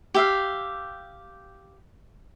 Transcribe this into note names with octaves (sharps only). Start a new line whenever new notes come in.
G4 E5 F5